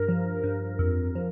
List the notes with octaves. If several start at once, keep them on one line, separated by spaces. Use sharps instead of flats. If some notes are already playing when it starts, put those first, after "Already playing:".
Already playing: G2 A#4
F3
G2
F2
F3